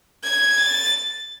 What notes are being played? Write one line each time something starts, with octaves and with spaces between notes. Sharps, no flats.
G#6
A6